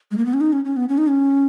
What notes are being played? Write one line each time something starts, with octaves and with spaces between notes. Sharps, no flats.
G#3
A#3
B3
C#4
D#4
C#4
C#4
B3
C#4
D#4
C#4